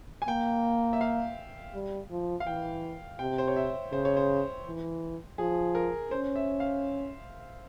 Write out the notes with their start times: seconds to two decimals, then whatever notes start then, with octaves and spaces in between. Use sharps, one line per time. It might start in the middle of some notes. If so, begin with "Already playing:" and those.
0.22 G#5
0.28 A#3 G5
0.93 E5
1.01 F5
1.74 G3
2.10 F3
2.40 F5
2.47 E3 G5
3.19 C3 G5
3.38 C5
3.48 C#5
3.56 E5
3.92 C#3 C5
4.05 C#5
4.17 C5
4.66 E3
5.38 F3 G#4
5.75 A#4
6.11 C#4 C5
6.36 E5
6.60 F5